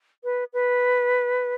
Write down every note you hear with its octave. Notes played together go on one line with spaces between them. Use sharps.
B4
B4